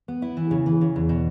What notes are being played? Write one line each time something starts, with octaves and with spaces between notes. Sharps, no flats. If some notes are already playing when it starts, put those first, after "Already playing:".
B3
E4
E3
C#3
E3
C#3
E2
B2